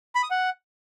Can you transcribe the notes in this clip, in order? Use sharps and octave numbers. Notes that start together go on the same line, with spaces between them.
B5
D#6
F#5